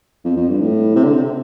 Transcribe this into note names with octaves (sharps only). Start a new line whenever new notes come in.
F2
F2
G2
A2
C3
D3
C3